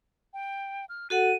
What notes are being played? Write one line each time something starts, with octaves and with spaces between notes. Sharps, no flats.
G5
F6
F#4 A4 F#5 D#7